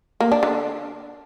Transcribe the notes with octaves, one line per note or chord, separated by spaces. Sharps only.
A#3
D4
D3